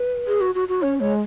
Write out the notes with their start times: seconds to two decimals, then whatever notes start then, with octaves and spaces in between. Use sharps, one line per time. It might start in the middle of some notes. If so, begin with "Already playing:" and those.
Already playing: B4
0.27 G#4
0.41 F#4
0.55 F#4
0.68 F#4
0.82 C#4 C#5
1.00 G#3 C#5